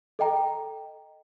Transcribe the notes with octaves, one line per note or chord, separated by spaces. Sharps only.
A4 D#5 G5 A#5